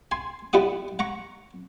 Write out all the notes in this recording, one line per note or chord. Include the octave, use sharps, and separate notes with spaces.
G#5 C6
G3 E4 G4 F#5 D#6
F#5 A#5 C#6